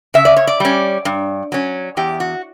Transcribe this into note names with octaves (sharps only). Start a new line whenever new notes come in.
C#3 E5
D5
C#5
D5
G3 C#4
G2
F#3 C#4
E2 G4
F#4